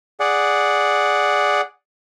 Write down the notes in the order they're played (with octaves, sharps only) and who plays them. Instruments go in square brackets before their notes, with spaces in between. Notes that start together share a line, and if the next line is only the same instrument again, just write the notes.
[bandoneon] G#4 D5 F#5